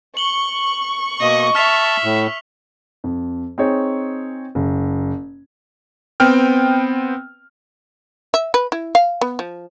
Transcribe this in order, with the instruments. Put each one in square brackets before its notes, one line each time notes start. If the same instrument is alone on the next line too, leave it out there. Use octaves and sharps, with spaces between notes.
[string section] C#6 [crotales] F#7 G7
[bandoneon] B2 A#3 [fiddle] D#5
[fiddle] E5 [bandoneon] A5 [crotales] F6 B6 F7
[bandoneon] A2
[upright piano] F2
C4 D#4 G#4 C#5
F#1
[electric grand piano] B3 C4 G5 F6
[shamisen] E5
B4
E4
F5
B3
F3